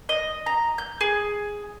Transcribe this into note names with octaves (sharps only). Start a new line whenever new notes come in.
D#5
A#5
G6
G#4